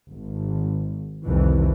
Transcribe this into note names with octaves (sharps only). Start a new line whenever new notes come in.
G#1
C2 F2 D#3 E3